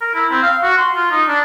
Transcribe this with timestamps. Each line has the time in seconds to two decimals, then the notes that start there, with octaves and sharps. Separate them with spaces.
0.01 A#4
0.15 E4
0.31 C4
0.43 F5
0.63 F#4
0.77 C6
0.96 F4
1.11 D#4
1.28 D4